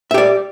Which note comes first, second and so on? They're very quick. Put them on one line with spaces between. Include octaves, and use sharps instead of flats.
E5 G4 D5